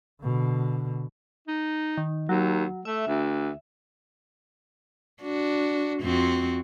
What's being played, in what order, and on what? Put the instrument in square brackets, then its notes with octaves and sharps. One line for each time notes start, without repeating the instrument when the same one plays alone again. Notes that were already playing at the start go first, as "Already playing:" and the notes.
[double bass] B2 D3
[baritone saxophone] D#4
[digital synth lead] D#3
[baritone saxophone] D#2 [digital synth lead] F#3
[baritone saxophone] A3 [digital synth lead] E5
[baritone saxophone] D2
[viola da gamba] D4 F#4
F2 C4 F#4